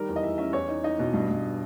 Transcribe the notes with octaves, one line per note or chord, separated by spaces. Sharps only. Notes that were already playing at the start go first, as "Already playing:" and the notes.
Already playing: D#3 G3 A#4
E2
D#5
E2 E5
C#4 E5
E2 C#5
D#4
D#4 D#5
B2
G2
G2